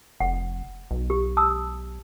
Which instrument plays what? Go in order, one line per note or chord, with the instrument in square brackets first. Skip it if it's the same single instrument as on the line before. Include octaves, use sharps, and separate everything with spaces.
[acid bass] F1 [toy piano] F#5
[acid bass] B1
[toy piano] G4
A5 D#6 E6